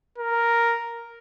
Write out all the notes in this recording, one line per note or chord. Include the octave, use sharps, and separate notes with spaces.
A#4